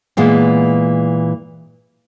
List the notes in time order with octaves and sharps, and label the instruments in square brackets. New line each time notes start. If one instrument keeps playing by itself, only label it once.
[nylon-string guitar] A#2 E3 G#3 B3